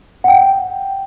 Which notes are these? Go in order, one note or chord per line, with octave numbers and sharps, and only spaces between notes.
F#5 G5